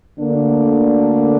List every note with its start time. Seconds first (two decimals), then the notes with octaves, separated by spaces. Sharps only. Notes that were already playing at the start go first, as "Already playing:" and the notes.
0.19 D2 D3 A#3 D4